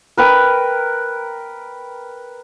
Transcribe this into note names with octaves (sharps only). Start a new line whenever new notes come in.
A#4 B4 G5